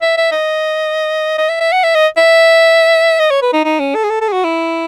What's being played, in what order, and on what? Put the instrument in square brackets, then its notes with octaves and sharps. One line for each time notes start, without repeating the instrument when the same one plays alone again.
[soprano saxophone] E5
E5
D#5
D#5
E5
E5
F#5
E5
D#5
E5
D#5
C#5
B4
D#4
D#4
C#4
A4
G#4
A4
A4
G#4
F#4
E4